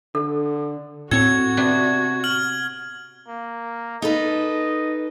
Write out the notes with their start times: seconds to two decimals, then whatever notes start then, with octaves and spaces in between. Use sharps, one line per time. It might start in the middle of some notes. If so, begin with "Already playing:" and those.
0.15 D3 A4
1.11 A2 C4 F#4 A4 C#5 G#6
1.57 C3 B3 D4
2.24 F6 F#7
3.28 A#3
4.02 D#4 A4 B4 D#5